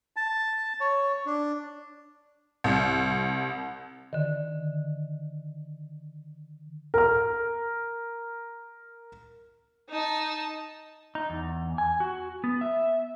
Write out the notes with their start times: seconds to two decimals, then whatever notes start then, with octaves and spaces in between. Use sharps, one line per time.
0.16 A5
0.81 C#5
1.26 D4
2.64 C2
4.13 D3 D#3
6.94 A#4 F6
9.89 D#4 A5
11.15 D#4
11.30 E2
11.78 G#5
12.00 F#4
12.44 B3
12.61 E5